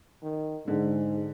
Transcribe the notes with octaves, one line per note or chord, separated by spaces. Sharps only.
D#3
G#2 D3 G#3